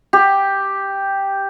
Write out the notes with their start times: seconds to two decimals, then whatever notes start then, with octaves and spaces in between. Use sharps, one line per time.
0.13 G4